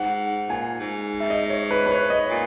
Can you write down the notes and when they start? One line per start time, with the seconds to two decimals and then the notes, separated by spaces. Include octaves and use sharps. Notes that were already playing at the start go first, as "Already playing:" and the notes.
Already playing: G#2 F#5
0.49 A#2 G#5
0.80 G#2
1.20 E5
1.30 D#5
1.50 C#5
1.71 B4
1.86 B4
1.91 C#5
2.10 D#5
2.30 A#2